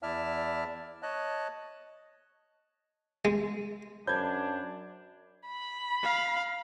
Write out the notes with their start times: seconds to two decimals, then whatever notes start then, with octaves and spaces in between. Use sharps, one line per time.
0.03 E2 E4 D5 E5 A5 F6
1.03 C#5 D#5 A5 F#6
3.25 G#3
4.07 F#2 D4 C5 B5 G6 G#6
5.47 B5
6.03 F5